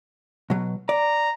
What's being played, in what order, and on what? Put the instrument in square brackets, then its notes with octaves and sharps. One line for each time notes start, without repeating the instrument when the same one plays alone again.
[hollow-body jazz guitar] B2 F#3
[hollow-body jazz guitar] D5 [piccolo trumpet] A#5